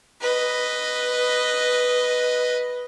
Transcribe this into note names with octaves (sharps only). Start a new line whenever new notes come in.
B4 D#5